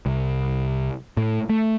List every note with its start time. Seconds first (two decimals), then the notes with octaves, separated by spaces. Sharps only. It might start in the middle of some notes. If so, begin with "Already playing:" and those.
0.06 C2
1.17 A2
1.50 A3